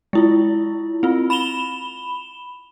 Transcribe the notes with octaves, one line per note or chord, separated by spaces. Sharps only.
G#3 E4 F4
C4 F4
B5 E7 F7 G7